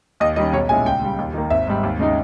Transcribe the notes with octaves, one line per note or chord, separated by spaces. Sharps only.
D#2 D#5
D#3 G3 C#4 D#5
B1 C#5
A#2 G#3 C#4 E4 G#5
C#2 G5
C#3 G3
D#2
D#3 A#3
G#1 E5
G#2 G3
D#2
C#3 G#3 D#4